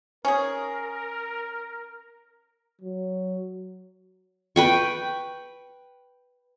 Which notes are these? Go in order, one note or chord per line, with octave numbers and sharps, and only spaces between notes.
C#4 G#4 A#4
F#3
B4 G5 C#6